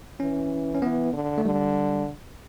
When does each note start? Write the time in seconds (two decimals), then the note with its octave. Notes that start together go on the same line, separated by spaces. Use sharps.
0.20 E3 C#4
0.75 C#4
0.82 E3 B3
1.13 D3
1.38 A3
1.45 D3 G3